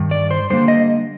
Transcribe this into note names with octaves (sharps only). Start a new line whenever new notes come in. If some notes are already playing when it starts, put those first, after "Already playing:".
Already playing: G2 D#3
D5
C5
D3 G3 A#3 C5
D#5